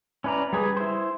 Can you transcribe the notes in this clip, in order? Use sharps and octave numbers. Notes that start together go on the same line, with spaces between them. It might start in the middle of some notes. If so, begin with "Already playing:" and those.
C#4 E4 B4 D5 A#5
G3 G#4 B4
E4 C5